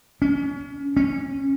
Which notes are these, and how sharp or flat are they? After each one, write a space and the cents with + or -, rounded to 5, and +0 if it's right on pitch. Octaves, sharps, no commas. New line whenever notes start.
C#4 +30
C#4 -20